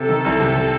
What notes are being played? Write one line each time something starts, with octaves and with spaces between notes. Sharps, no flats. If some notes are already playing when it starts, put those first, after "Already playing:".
Already playing: C3 A4
D#3
C2
C3 A4
C3